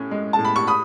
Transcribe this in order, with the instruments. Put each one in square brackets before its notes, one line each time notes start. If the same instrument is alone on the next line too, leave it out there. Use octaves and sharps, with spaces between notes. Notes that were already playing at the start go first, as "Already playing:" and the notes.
Already playing: [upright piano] A2 C#4
G#3
A5
A2
B5
C#6
B5 D#6